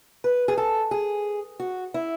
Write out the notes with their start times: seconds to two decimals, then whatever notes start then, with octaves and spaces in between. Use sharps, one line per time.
0.24 B4
0.48 G#4
0.57 A4
0.91 G#4
1.60 F#4
1.94 E4